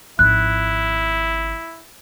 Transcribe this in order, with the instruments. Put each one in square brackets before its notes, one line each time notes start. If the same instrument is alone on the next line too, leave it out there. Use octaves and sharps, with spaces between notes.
[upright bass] G#1 F3 [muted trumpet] E4 [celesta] F#6